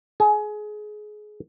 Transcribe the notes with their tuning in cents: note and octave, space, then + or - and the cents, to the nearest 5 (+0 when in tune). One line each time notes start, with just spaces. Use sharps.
G#4 +25